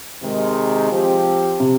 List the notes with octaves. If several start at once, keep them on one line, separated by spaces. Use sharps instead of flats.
C3 D#3 G#3
F3 C4 G4
C3